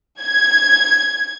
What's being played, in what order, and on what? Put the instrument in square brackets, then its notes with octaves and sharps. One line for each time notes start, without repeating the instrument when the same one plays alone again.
[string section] G#6